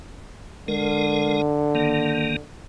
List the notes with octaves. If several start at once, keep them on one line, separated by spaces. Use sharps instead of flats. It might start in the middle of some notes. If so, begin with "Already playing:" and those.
D3 G#3 A#4
D#3 A#3